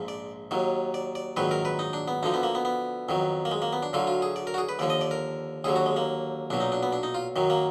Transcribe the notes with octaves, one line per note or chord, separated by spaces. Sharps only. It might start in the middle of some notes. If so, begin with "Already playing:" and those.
Already playing: A#1 G#2 F3
D5
D#2 D#3 F#3
D5
D5
A#1 G#2 D#3 F#3 B4
A#4
B4
D#4
D4
B3
D2 D3 F3 D#4
B3
A#3
B3
B3
F2 D#3 F#3
A#3
G#3
A#3
B3
D4
D2 D3 F#3 F4
F4
G#4
D5
A#4
F#4
G#4
B4
D#2 D3 F3 D5
D#5
D5
A#4
D#2 D3 F#3 G#4
F#4
G#3
A#3
B1 A#2 F#3 D4
D#4
D4
B3
D4
D#4
F4
F#2 D#3 F#3
A#3